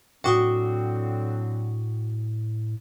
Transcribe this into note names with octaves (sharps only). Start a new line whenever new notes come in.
A2 D3 F#3 C4 F#4 G5 D6 D#6